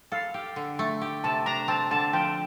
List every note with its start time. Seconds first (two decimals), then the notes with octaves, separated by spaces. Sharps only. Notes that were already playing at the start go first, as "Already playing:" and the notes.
0.12 A4 F5
0.34 G4
0.56 D3
0.79 A3
1.02 G4
1.24 C3 A5
1.46 D4 A#5
1.68 C4 A5
1.91 D3 A5
2.13 F3 G5